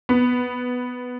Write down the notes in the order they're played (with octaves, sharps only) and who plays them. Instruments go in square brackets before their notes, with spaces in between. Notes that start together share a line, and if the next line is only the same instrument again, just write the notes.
[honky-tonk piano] B3